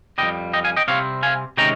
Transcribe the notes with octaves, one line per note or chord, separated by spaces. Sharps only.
F2 D#3 G3 D#5 G5
D#5 G5
F5 G#5
D#5 G5
C3 G3 C4 C#5 F5
F5 G#5
C3 D#3 G#3 C#4 G5 A#5